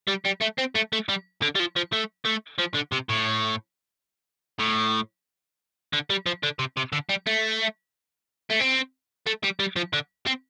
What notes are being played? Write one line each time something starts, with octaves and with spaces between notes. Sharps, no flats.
G3
G3
A3
C4
A3
A3
G3
D3
G3
F3
F3
A3
A3
F3
D3
C3
A2
A2
D3
G3
F3
D3
C3
C3
D3
G3
A3
A3
C4
A3
G3
G3
F3
D3
C4